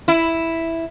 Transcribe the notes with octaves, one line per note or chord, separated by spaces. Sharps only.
E4